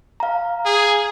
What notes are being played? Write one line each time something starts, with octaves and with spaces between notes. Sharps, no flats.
F5 A#5
G#4